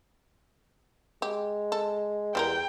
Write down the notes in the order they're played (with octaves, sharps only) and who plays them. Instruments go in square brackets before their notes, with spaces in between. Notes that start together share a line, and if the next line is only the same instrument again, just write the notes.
[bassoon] G#3 [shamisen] G4
[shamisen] A4
[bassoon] E2 [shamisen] G3 G#3 A#4 [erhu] G5